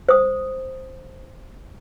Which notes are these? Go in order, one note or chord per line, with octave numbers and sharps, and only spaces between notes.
C5 D#6